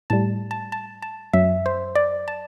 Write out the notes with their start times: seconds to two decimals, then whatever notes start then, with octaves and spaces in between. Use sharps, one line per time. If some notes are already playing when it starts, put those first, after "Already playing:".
0.10 A2 G3 A5
0.51 A5
0.72 A5
1.02 A5
1.33 F#2 F#3 E5
1.66 C5
1.95 D5
2.28 A5